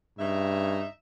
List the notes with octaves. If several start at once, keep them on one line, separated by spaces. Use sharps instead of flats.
G2 C#3 D#4 E5